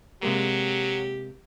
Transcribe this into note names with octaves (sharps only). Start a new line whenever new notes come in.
C3 F#3 G#3 A#3 G4